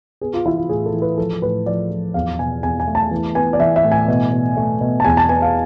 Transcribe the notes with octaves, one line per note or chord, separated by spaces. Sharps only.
B3 G#4
F4
E3 E4
F4
A2 G#4
A4
E3
B4
F3 A4
A2 B4
F3 D5
F3
E2 F5
B2 G#5
E2 G#5
G#5
A3
A5
E3
B3 G#5
D5
E3 E5
E5
A2
G#5
B2
B2
A3
B2
A5
E2 G#5
A5
B3 G#5
F5